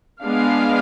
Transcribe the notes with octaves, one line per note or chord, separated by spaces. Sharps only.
G#3 B3 D4 F5